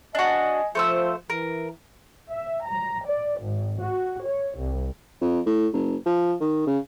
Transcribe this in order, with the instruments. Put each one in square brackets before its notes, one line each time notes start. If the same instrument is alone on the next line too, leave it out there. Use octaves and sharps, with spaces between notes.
[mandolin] D4 F#4 [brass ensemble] D#5 G#5
[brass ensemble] F3 [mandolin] A3 C5 E6
[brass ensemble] E3 [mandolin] A#4
[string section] E5
A#5
D5
G#1
F#4
C#5
C2
[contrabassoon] F2
A2
F#1
F3
D#3
C#3